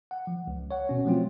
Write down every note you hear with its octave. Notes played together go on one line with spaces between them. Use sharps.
F#5
F3
C#2
C#5 F#5
B2 C#4
F3 F#3 A3 C4 F4